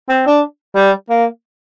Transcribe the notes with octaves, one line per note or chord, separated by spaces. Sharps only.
C4
D4
G3
A#3